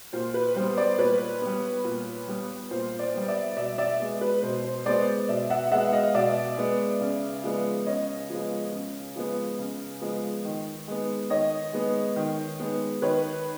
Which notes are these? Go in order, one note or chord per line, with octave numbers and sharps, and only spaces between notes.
A#2 C5
B4
G3 B3 C5
C5 D5
A#2 B4 C#5
G3 B3
A#2
G3 B3
A#2 C5
C5 D5
G3 B3
D5 E5
B2 D5 E5
D5 E5
G#3 B3
B4
B2 C5
C5
G#3 B3 C5 D5
B2 D5 E5
E5 F#5
G#3 B3 E5 F#5
D#5 F5
B2 D5 E5
G#3 B3
C#3
F3 G#3 B3
C#3 C#5 D#5
F3 G#3 B3
C#3
F3 G#3 B3
C#3
F3 G#3 B3
D#3
G#3 B3
D#3 C#5 D#5
G#3 B3
D#3
G#3 B3
D#3 B4 C#5